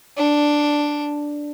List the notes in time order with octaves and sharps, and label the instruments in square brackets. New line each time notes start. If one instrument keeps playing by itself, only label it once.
[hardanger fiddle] D4